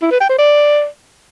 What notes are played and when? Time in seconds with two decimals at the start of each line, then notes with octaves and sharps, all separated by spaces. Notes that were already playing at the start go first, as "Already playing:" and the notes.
0.02 E4
0.11 B4
0.20 G5
0.29 C5
0.38 D5